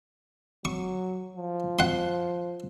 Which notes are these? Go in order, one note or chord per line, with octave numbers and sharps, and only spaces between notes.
F#3 C#6
F3
F#5 C6